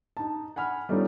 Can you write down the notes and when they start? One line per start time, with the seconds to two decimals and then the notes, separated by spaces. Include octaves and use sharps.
0.17 D#4 A5
0.56 F#5 G#5 B5 F6
0.89 G3 A3 B3 C#4 D#4 F4